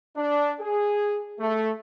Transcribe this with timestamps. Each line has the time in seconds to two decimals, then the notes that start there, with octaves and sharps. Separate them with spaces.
0.17 D4
0.60 G#4
1.40 A3